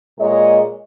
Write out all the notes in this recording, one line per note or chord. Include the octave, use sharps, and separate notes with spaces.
A#2 G#3 C#5 D#5